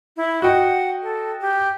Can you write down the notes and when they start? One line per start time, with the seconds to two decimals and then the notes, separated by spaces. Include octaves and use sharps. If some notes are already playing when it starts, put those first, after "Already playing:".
0.17 E4
0.42 F#4 D#5 F#5 G5
1.02 A4
1.41 G4